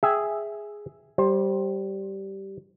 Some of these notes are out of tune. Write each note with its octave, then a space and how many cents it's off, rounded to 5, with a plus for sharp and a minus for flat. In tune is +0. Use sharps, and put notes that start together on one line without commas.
G#4 +0 E5 +0 G5 +0
G3 -10 C5 +15